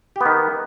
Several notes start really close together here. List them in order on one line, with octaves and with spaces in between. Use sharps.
G4 B3 D#3